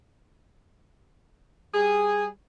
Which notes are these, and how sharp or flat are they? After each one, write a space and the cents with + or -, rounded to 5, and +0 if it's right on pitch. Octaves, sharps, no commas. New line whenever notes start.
G3 +0 G#4 -10